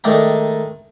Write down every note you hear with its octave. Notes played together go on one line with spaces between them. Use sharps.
D#3 G#3 A3 D5 G5 A#5